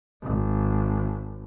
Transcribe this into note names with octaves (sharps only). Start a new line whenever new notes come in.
G#1